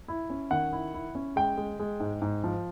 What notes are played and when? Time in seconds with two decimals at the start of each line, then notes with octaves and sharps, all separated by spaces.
0.08 E4
0.30 C#4
0.51 D#3 F#5
0.72 E4
0.94 E4
1.15 C#4
1.36 G#3 G5
1.57 G#3
1.79 G#3
2.00 G#2
2.22 G#2
2.44 F3